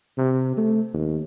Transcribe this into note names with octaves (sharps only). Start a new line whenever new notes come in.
C3
A3
D#2